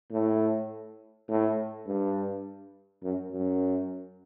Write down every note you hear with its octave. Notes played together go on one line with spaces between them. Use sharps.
A2
A2
G2
F#2
F#2